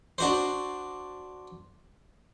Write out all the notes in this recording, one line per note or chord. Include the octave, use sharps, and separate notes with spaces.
D4 F#4 C5